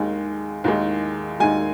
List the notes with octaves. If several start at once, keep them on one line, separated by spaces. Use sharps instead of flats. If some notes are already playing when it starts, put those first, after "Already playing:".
Already playing: D#2 D#3 G#3
D#2 D#3 G#3
D#2 D#3 G#3 G#5